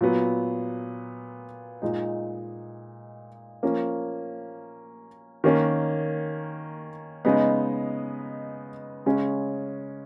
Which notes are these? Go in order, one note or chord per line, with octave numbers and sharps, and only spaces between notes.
A#2 F#3 B3
A#2 G#3 D#4
F3 A#3 C#4
D#3 A#3 C#4
C#3 G#3 B3 D#4
C#3 G#3 C#4